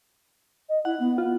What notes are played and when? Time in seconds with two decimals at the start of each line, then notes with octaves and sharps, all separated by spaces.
0.69 D#5
0.85 E4 F#5
1.00 B3
1.18 F4